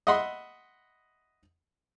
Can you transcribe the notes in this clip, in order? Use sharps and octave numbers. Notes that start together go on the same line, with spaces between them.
D#5 E5 F#5 B5 C6 D#6